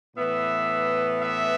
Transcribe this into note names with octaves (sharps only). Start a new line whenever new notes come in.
A2 E3 B3 E5
E5